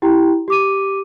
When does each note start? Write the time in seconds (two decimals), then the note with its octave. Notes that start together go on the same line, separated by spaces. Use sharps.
0.02 E4 G4 G5 A#5
0.48 G4 D6 D#7